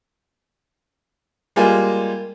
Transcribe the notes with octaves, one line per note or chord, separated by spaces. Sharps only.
G3 G#3 A#3 F4 G#5